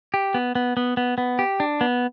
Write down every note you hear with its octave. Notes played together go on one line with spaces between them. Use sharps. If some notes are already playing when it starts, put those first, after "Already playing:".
G4
B3
B3
B3
B3
B3
G4
D4
B3